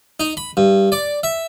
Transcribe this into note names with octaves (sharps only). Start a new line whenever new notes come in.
D#4
B5
G2
D5
E5